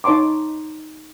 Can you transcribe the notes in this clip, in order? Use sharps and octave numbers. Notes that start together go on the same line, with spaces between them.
D#4 C#5 A5 C6 D6